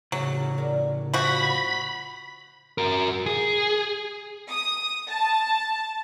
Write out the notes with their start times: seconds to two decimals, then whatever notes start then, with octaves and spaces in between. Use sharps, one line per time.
0.12 A2 C#3 F#3
0.58 A#4 D5
1.14 F3 F#4 B5
2.78 F#4 A#4
3.26 G#4
4.49 D#6
5.08 A5